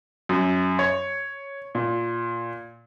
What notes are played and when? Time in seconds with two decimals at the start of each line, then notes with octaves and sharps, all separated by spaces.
0.29 F#2
0.79 C#5
1.75 A#2